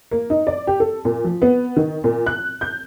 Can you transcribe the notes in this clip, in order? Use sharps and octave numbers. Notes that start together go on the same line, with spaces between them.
A#3
D#4
D5
G4
A4
A#2
F3
B3
D#3
A#2
F#6
G6